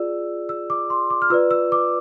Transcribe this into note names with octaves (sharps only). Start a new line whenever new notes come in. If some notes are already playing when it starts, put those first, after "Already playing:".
Already playing: F4 G#4 D5 E6
E6
D6
C6
D6
F6
F4 B4 D5 E6
E6
D6